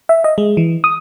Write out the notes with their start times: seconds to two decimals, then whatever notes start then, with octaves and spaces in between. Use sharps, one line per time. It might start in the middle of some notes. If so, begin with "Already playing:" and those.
0.09 E5
0.24 D#5
0.38 G#3
0.57 E3
0.84 D#6